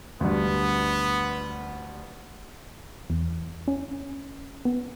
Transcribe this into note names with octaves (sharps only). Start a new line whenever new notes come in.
D2 G2 B3
E2
C#4
B3